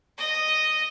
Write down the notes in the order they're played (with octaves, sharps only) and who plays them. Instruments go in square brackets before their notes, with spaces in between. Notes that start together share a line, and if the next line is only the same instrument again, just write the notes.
[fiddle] D#5